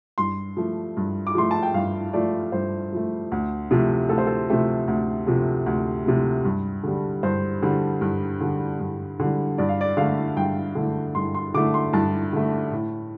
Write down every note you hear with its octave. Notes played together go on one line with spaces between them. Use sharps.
G2 C6
F3 A3
G2
D6
F3 A3 C6
A5
G5
G2 F5
F3 A3 D5
G2 C5
F3 A3
D2
C3 F3 A3
D2 A4
C5
A4
C3 F3 A3 G4
D2
C3 F3 A3
D2
C3 F3 A3
G2
D3 G3
G2 C5
D3 G3
G2
D3 G3
G2
D3 G3
G2 D5
F5
D5
D3 A3 F5
G2 G5
D3 A3
G2 C6
C6
D3 A3 D6
C6
G2 A5
D3 A3
A2